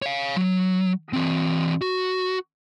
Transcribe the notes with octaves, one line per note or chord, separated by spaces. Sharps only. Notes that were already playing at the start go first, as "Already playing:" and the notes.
C#5 F5
F#3
E3 C4
F#4